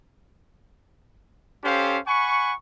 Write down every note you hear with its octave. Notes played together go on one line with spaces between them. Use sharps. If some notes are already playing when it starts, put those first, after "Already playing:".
C#4 G4 A4 C5 F5
F#5 G#5 B5 C#6